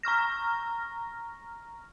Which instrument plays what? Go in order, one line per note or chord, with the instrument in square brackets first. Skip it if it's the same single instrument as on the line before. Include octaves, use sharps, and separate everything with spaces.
[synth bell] A#5 C#6 F6 A#6